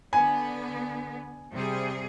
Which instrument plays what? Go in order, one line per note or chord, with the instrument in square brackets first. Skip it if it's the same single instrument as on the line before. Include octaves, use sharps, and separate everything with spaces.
[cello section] D3 B3 [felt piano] G#5
[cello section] C3 G3 G#4